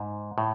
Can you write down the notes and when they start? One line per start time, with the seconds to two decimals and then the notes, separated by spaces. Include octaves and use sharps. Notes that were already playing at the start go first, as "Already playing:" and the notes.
Already playing: G#2
0.38 A2